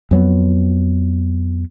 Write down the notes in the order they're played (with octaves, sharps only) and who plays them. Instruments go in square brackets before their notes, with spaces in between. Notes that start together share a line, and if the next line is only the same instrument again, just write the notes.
[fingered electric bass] F2 F#3 B3